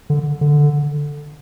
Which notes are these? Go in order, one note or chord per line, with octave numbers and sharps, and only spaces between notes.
D3
D3